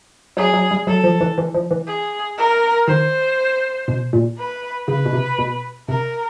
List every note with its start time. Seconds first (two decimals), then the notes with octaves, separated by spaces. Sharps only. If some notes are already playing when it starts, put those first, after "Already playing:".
0.37 F#3 G#4
0.54 F#3
0.71 G3
0.87 F#3 A4
1.04 F3
1.21 E3
1.38 E3
1.55 F3
1.71 E3
1.87 G#4
2.38 A#4
2.87 D#3 C5
3.88 B2
4.13 A#2
4.39 B4
4.88 C#3 B4
5.06 B2
5.13 C3
5.39 B2
5.89 C3 A#4